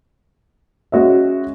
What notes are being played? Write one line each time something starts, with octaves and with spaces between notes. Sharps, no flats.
G#3 C#4 F#4 C#5 E5